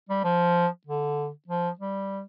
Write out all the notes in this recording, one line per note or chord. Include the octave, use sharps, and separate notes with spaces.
G3
F3
D3
F3
G3